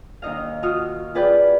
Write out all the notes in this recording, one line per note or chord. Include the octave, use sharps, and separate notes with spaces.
D#2 D#4 D#5 F5
F4 F#4 D#6 F6
F4 G#4 B4 D5 G5